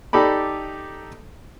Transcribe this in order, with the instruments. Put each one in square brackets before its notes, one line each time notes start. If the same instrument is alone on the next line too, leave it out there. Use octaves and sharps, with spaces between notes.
[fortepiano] D#4 G4 A4 D5 B5